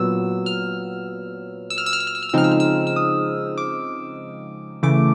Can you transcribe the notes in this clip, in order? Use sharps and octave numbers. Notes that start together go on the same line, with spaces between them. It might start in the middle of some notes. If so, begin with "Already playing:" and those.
Already playing: A#2 F#3 B3 E6
F6
E6
F6
E6
F6
E6
F6
E6
F6
E6
C#3 F3 G#3 C4 D#4 F6
E6
F6
E6
E6
D#6
D6
C#3 E3 A3 D6